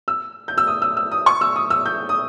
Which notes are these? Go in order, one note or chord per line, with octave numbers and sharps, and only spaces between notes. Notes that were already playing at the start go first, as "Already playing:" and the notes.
E6
G6
E6
D#6
E6
E6
D#6
C#6
E6
D#6
E6
G6
D#6